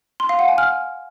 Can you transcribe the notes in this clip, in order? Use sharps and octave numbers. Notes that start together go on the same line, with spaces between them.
C6
F5
F#5
G#5
F6